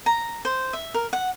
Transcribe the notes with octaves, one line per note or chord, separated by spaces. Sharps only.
A#5
C5
E5
A#4
F#5